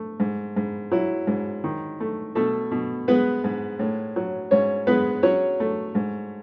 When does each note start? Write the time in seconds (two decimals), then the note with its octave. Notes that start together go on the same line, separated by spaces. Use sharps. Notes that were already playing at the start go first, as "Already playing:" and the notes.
Already playing: A3
0.20 G#2
0.56 G#2
0.92 F#3 E4
1.27 G#2
1.64 D#3
2.00 A3
2.35 B2 A3 A4
2.71 B2
3.08 G#3 B3 B4
3.44 G#2
3.79 A2
4.16 F#3
4.51 G#2 C#4 C#5
4.87 G#3 B3 B4
5.23 F#3 C#4 C#5
5.60 A3
5.95 G#2